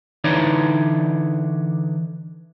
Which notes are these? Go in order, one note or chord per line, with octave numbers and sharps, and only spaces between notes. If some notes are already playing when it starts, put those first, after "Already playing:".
D3 E3 D#4 C#5 D5